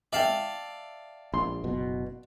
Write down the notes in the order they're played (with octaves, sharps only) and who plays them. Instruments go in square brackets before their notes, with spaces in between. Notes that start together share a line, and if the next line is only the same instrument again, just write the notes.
[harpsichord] D5 F5 A5 [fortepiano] E5 G5
[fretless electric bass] A#1 [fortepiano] C6
[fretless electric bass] F#1 B2